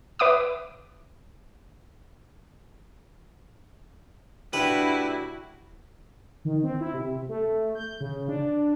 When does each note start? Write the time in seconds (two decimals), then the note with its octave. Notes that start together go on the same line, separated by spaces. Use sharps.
0.19 B4 E5 D6 D#6
4.53 A2 D4 E4 F#4 G4 B4
6.45 D#3
6.63 C4
6.81 E4
6.94 C3
7.29 A3
7.75 G6
8.01 C#3
8.29 D4